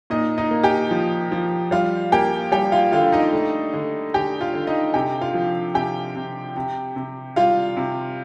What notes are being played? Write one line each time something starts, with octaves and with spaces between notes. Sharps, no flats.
A#2 D#4 D#5
D#4 D#5
A#3
G4 G5
F3
F3
G3 F4 F5
A#3 G4 G5
G3 G4 G5
F4 F5
D3 F4 F5
D#4 D#5
A3
D3
D3 G4 G5
F4 F5
D3
D#4 D#5
C3 G4 G5
F4 F5
F3
C3 G4 G5
C3
C3
C3
G3 F4 F5
C3